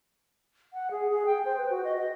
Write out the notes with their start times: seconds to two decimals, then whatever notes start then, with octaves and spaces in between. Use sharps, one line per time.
0.73 F#5
0.91 G#4
1.10 G#4
1.26 G5
1.45 C5
1.57 B4
1.70 F#4
1.84 D#5
1.97 D#5